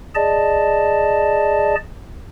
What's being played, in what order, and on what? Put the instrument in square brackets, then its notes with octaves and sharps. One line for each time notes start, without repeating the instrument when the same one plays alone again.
[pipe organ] G#4 D5 D#5 A5